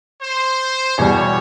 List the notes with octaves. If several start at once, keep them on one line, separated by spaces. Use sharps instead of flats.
C5
E2 B2 G3 C#5